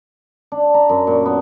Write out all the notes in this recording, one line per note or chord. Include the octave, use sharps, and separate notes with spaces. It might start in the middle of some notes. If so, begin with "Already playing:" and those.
D4
A#5
F#2
A#2
B3